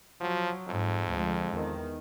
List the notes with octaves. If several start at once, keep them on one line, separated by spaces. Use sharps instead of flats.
F3 F#3
F2 G#2
D2 F3 G#3
E2 D#3